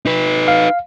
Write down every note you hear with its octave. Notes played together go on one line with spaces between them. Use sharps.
D#4 B4
F5